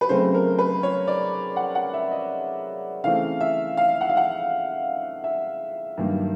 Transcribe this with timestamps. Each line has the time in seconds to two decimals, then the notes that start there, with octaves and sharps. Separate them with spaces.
0.01 B4
0.09 C#3 F#3 A3 C4 C5
0.34 A#4
0.59 B4
0.83 C#5
1.07 D5
1.56 F#5
1.75 F#5
1.94 E5
2.11 D#5
3.04 C#3 E3 A3 C4 F5
3.41 E5
3.77 F5
4.01 F#5
4.10 F5
4.17 F#5
5.24 E5
5.97 G2 D#3 F#3 A#3